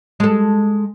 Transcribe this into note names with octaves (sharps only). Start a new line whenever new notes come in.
G#3 A4